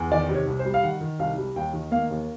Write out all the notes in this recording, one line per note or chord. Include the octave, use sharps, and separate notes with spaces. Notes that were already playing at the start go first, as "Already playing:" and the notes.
Already playing: E2
D#3 D5
C3
C#5
C2
C5
G3
F5
D#3 F#5
D#3
C2 F5
G3
D#2 G5
D#3
A#3 F5
D#2